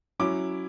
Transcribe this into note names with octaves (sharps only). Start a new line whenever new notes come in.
F#3 C#4 E4 D6